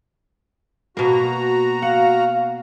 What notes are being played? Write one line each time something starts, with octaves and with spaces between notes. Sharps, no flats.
B2 A#3 F#4 A#5
F5 F#5